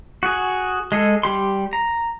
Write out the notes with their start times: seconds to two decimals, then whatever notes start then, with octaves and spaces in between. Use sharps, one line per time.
0.23 F#4 G#4
0.92 G#3 G#4 A4
1.23 G3 G4 C6
1.73 A#5